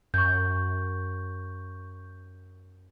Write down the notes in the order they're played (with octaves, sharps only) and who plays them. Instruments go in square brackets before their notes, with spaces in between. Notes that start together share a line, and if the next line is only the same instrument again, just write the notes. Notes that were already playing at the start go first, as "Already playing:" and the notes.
[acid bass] F#2 [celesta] C#6 G6